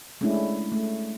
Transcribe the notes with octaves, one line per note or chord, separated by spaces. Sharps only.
G#3 A3 C#4 D4 E4
A3